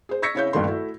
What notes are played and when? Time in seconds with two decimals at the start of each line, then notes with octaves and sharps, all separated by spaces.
0.09 G#4 C5
0.22 C#6 E6 G#6 A#6 B6 C#7
0.35 C#3 C#4 E4 C#5 F5 G6
0.53 G1 G2 A#2 D#3 A3 C6
0.68 A3 E4 F#4